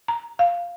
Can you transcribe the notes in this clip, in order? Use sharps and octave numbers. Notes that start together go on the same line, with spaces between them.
A#5
F5